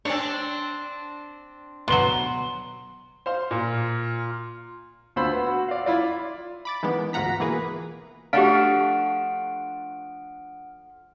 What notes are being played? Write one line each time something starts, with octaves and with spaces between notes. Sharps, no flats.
C4 D4 C#5
B2 F#3 C6 G7
C5 F5 C6
A#2 F4
D2 F4 C5 B5 E6
B3
F#4
D5 F5
E4 F4 D5
B5 D6 A6
D#3 E3 G#3 B3
D2 G#2 F4 F#5 A#5 B6
B2 E3 A#3 G#4 B4
F3 A3 D4 G4 F5 F#5 F6 D7